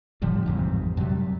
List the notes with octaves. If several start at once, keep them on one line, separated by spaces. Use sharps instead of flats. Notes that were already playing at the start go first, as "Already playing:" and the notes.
A2 D3 F3 G3
A1 F2 G#2 C3
F#2 C3 F#3 G3